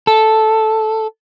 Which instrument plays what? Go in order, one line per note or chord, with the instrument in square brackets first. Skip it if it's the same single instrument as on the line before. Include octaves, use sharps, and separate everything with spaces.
[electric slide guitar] A4